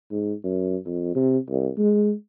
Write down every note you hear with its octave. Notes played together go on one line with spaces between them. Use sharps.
G#2
F#2
F2
C3
C2
G#3